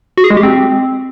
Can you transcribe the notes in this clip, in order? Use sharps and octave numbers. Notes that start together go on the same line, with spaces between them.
F#4
G#4
G#3
G4
C4